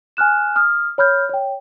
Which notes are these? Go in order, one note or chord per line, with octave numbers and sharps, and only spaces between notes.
G#5 F6 F#6 E7
D#6 F6
C#5 B5 F6 G6
C#5 G5